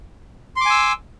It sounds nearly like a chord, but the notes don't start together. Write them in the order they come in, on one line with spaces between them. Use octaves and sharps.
C6 D6 G#5 E6